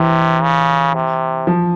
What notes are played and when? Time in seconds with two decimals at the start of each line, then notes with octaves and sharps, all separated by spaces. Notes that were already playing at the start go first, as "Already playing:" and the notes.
Already playing: C3 E3
0.43 C#3
0.95 C3
1.47 F3